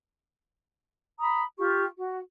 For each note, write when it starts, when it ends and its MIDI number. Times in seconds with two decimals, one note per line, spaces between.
1.19 1.42 82
1.19 1.42 83
1.19 1.42 87
1.57 1.82 65
1.57 1.82 67
1.57 1.82 85
1.97 2.17 66